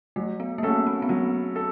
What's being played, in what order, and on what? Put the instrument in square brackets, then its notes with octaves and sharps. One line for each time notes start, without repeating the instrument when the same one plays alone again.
[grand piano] F#3 [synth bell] A3
[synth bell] B3
A#3
[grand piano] A3 C#4 F#4 A4 [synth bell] B3
[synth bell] C4
B3
[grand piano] F#3 [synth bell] C4
[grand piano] A4